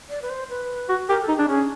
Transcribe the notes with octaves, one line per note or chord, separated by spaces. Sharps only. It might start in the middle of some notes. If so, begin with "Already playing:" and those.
D5
B4
C5
B4
F#4
G4 A#4
A4
D#4
D4 G#4
C#4 G#4